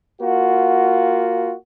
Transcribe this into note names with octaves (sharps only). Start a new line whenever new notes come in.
A#3 F4 F#4